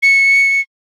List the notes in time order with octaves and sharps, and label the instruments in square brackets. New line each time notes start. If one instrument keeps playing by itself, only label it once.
[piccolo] C#7